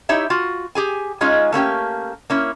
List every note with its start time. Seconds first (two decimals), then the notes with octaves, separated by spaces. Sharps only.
0.09 D#4 E4 G4 C#5 E5
0.30 F4 F#4
0.75 G4 G#4 G#5
1.21 G#3 C#4 D#4 F4 G#4
1.52 A3 A#3 C#4 G4
2.30 A#3 C#4 E4